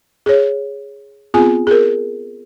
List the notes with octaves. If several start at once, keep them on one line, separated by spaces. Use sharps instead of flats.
G#4 C#5
B3 C4 F4 G#4 G#5
G#4 A#4